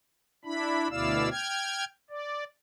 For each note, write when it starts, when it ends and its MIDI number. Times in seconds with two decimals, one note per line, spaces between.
0.45 0.88 62
0.45 0.88 64
0.45 0.88 83
0.90 1.29 38
0.90 1.29 47
0.90 1.29 64
0.90 1.29 74
0.90 1.29 77
0.90 1.29 88
1.31 1.84 79
1.31 1.84 89
1.31 1.84 92
2.10 2.44 74